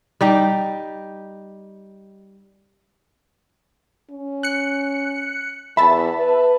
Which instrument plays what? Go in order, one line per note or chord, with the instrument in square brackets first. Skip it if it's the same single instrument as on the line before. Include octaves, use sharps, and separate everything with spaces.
[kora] G3 D#4 G4
[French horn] C#4
[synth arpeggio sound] F#6 C#7
[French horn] E2 [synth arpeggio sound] E5 A5 [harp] B5
[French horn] B4